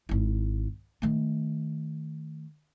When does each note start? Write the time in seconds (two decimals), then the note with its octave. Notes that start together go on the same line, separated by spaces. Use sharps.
0.09 G#1 E4
1.02 D#3 A3